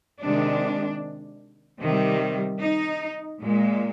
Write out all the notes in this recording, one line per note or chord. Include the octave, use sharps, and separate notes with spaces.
C3 D#3 G#3 D4
C3 D#3 G3
D#4
A#2 G#3